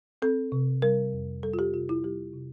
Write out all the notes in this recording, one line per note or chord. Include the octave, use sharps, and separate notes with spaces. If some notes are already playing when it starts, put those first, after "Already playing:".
C4 A4
C3
G3 A#4
F2
G3 A4
F4
G4
C3 F4
E4
G3 G4
C3